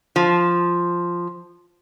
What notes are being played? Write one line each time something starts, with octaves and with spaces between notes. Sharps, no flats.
F3